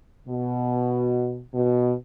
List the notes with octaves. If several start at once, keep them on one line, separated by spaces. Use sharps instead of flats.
B2
B2